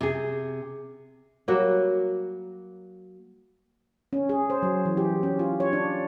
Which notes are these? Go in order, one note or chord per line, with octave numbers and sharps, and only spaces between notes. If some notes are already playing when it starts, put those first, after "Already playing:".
C3 G#4
F#3 G3 A#3 F#4
C#4
G#4
C5
F#3
E3
G4
C#4
F4
C#5
D4